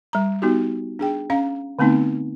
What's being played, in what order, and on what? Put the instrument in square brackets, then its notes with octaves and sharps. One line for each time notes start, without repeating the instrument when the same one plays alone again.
[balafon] G3 A#5
B3 D#4 F#4 G4
D4 G#4 G5
C#4 F5 A#5
D3 A3 B3 C4 D#4